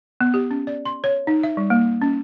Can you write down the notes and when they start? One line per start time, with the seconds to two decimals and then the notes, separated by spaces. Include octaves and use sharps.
0.21 B3
0.34 G4
0.51 C#4
0.67 D5
0.85 C6
1.04 C#5
1.27 D#4
1.43 E5
1.57 G3
1.70 A#3
2.02 C#4